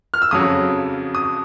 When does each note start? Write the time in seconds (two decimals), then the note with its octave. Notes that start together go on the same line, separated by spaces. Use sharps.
0.14 F6
0.22 E6
0.31 F2 C#3 F#3 D#6
1.15 D#6